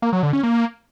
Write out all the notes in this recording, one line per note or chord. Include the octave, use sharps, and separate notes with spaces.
A#3
F#3
D3
C#4
A#3